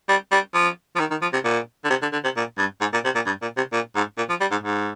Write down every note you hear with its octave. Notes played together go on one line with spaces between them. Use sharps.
G3
G3
F3
F3
D#3
D#3
F3
C3
A#2
D3
C3
D3
D3
C3
A#2
G2
G#2
A#2
C3
A#2
G2
A#2
C3
A#2
G#2
A#2
F3
G3
G#2
G#2